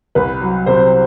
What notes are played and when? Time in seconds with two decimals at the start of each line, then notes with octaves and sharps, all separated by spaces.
0.15 C2 B4
0.41 F#3
0.66 C3 C5